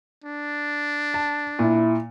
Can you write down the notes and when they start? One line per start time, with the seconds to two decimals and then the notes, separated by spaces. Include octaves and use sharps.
0.24 D4
1.14 A5
1.59 A#2 E4